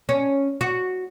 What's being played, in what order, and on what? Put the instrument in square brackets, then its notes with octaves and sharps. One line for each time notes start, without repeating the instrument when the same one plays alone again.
[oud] C#4
F#4